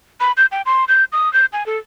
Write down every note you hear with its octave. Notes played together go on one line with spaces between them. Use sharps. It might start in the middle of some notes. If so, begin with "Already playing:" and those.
B5
G6
G5
C6
G6
D#6
G6
G#5
A4